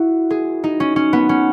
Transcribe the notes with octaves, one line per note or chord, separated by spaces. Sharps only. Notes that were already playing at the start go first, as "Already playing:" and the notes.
Already playing: E4 F#4
G#4
D#4
C#4
C#4
B3
C#4